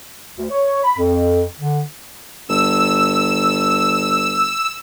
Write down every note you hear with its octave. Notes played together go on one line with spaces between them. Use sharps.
D2
C#5
B5
F2
D3
G1 E6